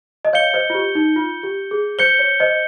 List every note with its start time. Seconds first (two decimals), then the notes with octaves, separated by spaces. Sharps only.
0.25 D#5
0.33 C#5 F5 G6 C#7 G7
0.53 C5 D#5
0.70 F4
0.75 G4
0.95 D#4
1.16 F4
1.43 G4
1.71 G#4
1.99 C5 G6 C#7 G7
2.19 C#5
2.40 C5 D#5